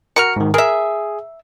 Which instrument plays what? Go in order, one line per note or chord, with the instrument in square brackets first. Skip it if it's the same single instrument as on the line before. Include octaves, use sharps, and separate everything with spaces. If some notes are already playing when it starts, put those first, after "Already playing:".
[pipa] F#4 A#4 [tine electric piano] F6 C#7
[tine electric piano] G#2 D#3
[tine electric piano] G#4 [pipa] A#4 E5